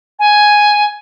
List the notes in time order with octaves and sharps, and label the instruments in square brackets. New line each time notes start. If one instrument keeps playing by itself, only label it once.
[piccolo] G#5